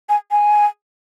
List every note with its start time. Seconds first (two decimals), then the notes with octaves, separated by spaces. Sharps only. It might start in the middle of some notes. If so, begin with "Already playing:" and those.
0.09 G#5
0.31 G#5